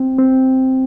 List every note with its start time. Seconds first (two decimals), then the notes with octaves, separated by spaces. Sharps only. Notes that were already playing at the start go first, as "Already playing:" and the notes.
Already playing: C4
0.19 C4